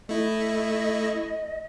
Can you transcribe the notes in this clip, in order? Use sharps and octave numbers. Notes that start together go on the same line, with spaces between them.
A3 E4 D#5